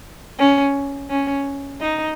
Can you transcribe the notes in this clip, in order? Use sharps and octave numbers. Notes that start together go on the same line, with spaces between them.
C#4
C#4
D#4